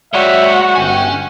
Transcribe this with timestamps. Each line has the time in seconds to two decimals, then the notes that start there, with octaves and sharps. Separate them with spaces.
0.14 G#3 F#4 G4 C#5 D5 E5
0.76 G1 C#4 G5 G#5